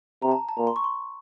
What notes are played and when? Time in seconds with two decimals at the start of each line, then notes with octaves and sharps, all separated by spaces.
0.22 C3 A#5
0.32 A5
0.49 A5
0.57 A#2 A#5
0.67 C6
0.76 C#6
0.84 C6